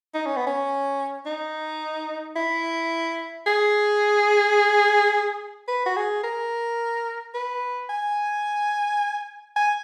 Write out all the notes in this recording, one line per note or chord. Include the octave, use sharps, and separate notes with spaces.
D#4
C#4
B3
C#4
D#4
E4
G#4
B4
F#4
G#4
A#4
B4
G#5
G#5